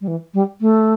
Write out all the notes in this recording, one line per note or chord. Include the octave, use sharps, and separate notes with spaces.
G3
E3
G3
A3